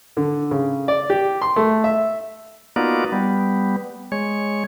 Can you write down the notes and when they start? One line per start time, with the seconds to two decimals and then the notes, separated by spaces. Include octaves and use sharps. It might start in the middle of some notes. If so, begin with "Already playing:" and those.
0.17 D3
0.51 C#3
0.88 D5
1.10 G4
1.42 C6
1.56 A3
1.84 E5
2.76 A#3 B3 D#4 F4 F#4 D5
3.12 G3 B3
4.12 G#3 C#5